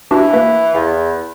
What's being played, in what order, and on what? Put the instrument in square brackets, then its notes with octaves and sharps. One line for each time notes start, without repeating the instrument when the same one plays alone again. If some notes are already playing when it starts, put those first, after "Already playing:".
[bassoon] E3 [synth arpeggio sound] D4 F#4 G4
[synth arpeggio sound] A#3 B4 B6
[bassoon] E2 [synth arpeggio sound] F5